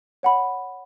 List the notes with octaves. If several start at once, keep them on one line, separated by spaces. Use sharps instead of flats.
C#5 F#5 B5